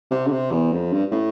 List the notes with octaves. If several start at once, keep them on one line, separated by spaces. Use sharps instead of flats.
C3
D3
C3
E2
F2
G2
A2